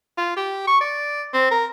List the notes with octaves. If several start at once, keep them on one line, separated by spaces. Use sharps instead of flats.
F4
G4
C#6
D5
C4
A#4